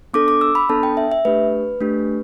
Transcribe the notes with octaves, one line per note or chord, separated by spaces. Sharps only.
B3 D4 A4 D6
D6
E6
B5
B3 D4 A4 A5
G5
E5
E5
A3 D4 G4 B4
A3 D4 G4